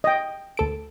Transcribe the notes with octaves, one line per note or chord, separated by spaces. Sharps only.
D#5 G5
D2 A4 D7